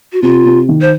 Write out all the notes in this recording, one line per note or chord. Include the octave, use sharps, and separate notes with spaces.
F#4
C3 F4
C3
D#3
C5